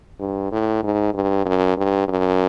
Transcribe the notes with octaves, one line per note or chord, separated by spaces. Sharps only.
G2
A2
G#2
G2
F#2
G2
F#2